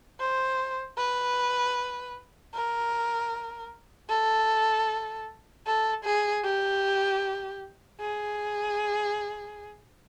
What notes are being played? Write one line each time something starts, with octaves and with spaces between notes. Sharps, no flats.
C5
B4
A#4
A4
A4
G#4
G4
G#4